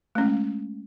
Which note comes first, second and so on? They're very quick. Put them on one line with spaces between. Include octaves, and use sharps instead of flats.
A3 C#4 G#3